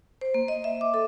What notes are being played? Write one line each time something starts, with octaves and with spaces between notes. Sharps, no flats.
C5
A#3
D#5
E5
D6
A4